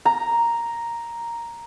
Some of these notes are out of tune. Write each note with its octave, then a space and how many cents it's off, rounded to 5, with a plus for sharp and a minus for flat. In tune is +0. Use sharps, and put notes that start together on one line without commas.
A#5 +0